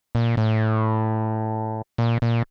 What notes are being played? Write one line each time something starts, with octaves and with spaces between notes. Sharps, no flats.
A#2
A2
A#2
A#2